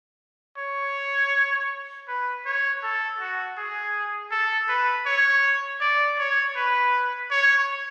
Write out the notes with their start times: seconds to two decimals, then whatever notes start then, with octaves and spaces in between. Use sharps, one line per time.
0.58 C#5
2.08 B4
2.46 C#5
2.83 A4
3.20 F#4
3.57 G#4
4.31 A4
4.69 B4
5.06 C#5
5.81 D5
6.19 C#5
6.56 B4
7.31 C#5